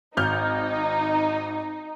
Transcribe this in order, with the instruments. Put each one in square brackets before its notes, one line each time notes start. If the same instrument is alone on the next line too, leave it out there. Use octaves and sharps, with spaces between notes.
[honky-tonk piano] G#1 F6 G6 [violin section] D#4